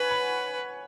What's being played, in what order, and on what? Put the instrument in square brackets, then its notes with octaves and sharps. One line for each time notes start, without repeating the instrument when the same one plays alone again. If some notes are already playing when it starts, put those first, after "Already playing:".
Already playing: [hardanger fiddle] B4 [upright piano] C#5 F#5 G#5 B5
[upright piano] B5